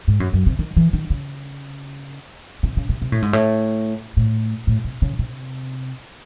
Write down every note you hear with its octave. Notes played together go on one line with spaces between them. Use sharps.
G#2
F#2
F#2
C3
D#3
E3
D#3
C#3
C3
C#3
C3
C3
A2
G#2
A2
A2
A2
C3
C#3
C3